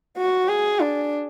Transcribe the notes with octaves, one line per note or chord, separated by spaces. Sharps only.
F#4
G#4
D4